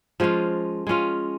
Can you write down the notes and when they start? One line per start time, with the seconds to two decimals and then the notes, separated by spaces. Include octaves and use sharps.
0.20 F3 G#3 C#4 F4
0.87 G#3 C#4 F4